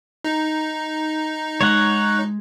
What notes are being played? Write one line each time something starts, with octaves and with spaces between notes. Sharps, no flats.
D#4
G#3 C#5 F#5